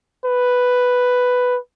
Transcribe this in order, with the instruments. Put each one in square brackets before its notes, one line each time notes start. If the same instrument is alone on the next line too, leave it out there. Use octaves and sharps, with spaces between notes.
[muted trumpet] B4